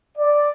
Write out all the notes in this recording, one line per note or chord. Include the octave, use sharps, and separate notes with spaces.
D5